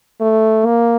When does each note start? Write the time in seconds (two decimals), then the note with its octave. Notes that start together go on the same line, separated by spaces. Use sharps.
0.21 A3
0.65 A#3